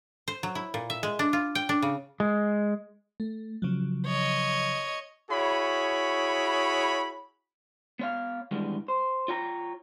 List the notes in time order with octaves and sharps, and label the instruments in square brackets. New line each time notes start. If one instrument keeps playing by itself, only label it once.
[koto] C5
F#3
E4
A#2
E5
G#3
D4
F4
G5
D4
C#3
[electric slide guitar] G#3
[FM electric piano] A3
C#3 F3 F#3
[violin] C#5 D#5
[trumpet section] E4 F#4 G#4 C#5 B5
[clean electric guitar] B3 C#5 F5
G2 D#3 E3 G3 G#3 B3
C5
F4 C#5 G5 A#5